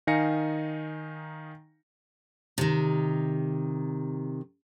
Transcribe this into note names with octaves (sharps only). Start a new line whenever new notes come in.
D#3 D#4 F5 G#5 A#6 C#7
C3 D#3